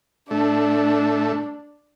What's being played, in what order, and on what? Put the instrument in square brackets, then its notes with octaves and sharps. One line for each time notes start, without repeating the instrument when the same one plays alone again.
[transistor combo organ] A2 A3 [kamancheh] D4